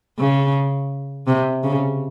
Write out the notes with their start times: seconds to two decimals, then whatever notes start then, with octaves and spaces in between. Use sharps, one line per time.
0.19 C#3
1.27 C3
1.64 C#3